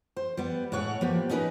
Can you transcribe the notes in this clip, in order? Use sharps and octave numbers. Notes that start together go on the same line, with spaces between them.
C5
G3 B3
A2 G#3 C#5 F#5
F3 A#3 B3 G4
C#4 D#4 G#4 A#4 B4